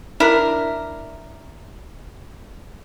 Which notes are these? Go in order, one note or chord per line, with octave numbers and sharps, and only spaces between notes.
D4 E4 A#4